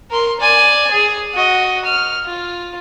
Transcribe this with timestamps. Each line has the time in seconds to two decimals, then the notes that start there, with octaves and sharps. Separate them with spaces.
0.11 A#4 C6
0.40 D5 G#5
0.91 G#4
1.34 F#4 D#5
1.85 F6
2.26 F4